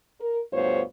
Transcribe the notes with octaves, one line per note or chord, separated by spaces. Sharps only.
A#4
D2 G2 B3 F4 C5 C#5